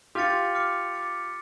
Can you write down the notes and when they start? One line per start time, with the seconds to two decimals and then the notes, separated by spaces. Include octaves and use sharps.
0.15 F4 G4 D6 F6 A6 C#7
0.55 D6 F6 A6 C#7
0.93 D6 F6 A6 C#7